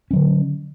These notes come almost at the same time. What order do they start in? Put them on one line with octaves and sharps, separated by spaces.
C#4 F#3 D3